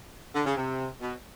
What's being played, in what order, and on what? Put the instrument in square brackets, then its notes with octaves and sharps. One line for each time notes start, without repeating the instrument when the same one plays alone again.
[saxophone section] D3
C#3
C3
B2